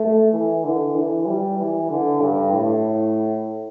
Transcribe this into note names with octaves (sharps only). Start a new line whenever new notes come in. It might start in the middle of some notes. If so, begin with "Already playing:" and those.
Already playing: A3
E3
D3
E3
G3
E3
D3
G2
A2